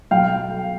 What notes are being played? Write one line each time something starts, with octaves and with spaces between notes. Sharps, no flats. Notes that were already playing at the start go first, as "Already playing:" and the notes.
B1 F5 G5